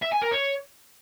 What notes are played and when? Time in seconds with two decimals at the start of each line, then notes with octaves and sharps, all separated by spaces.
0.03 E5
0.12 G#5
0.22 A#4
0.32 C#5